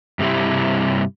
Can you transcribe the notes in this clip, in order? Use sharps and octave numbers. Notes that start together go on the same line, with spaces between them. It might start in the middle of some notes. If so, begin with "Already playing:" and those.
G2 C3 G3 E4